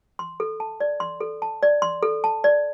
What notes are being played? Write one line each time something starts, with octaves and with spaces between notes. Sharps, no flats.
C6
A4
A5
D5
C6
A4
A5
D5
C6
A4
A5
D5